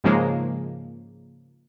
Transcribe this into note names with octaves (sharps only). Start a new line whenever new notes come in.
G#2 C#3 F3 G#3 A#3